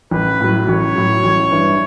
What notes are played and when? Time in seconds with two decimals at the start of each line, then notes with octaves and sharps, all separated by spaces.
0.11 A1 B4
0.40 A2 F#3
0.67 A1 C#5
0.96 A2 F#3
1.24 A1
1.51 G2 E3